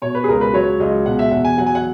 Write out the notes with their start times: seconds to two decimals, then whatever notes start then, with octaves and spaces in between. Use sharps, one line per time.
0.02 B2 C#5
0.15 B4
0.24 G#4
0.28 C#2 A#4
0.41 B4
0.54 F#3 C#5
0.80 C#2 D#5
1.06 B2 F#5
1.19 E5
1.31 E2 F#5
1.45 G#5
1.58 F#3 F#5
1.66 G#5
1.75 F#5